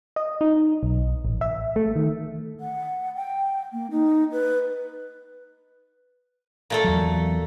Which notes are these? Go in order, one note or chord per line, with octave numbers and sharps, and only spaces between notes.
D#5
D#4
B1
A1
E5
A3
D#3
F#5
G5
A#3
D#4
B4
A#2 A3 A4
E2 F#3